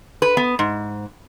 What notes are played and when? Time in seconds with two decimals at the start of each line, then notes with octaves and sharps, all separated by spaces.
0.22 B4
0.37 B3
0.59 G#2